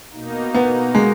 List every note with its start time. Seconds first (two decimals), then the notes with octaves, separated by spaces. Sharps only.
0.13 B2 A#3 D#4
0.55 B3
0.95 G#3